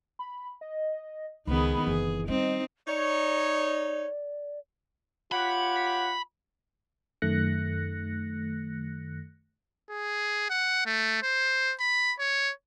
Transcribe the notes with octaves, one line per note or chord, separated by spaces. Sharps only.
B5
D#5
C#2 D#3 B3 G#4 B5
F#1 E3 G#4
G3 C4 D#4 D#5
D#4 C#5 D5
F4 G4 C#5 F#5 B5
F#2 D#3 A3 F#6 A#6 C#7
G#4
F#5
A3
C5
B5
C#5